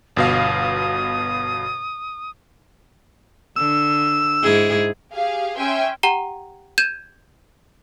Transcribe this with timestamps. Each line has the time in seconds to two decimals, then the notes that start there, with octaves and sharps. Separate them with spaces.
0.17 G1 B2 F5 D#6
3.56 D3 E6
4.43 G#2 E4 G#4
5.13 G4 G#4 F5
5.57 C#4 E5 G5 G#5 C6
6.03 G4 F#5 G5 A#5 G7
6.78 G6 G#6 D#7 E7